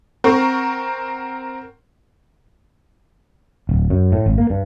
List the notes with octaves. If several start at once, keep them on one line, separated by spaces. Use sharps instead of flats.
C4 A#4 F#5 C#6
D1
F#2
A2
G#1
A#3
G2